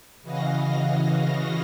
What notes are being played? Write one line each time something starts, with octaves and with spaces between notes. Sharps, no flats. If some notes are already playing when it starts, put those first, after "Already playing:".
C#3 E3 F#4 D#5 F5 A#6